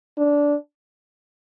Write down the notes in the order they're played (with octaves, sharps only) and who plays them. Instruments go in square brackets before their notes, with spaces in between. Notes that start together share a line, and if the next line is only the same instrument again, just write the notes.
[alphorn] D4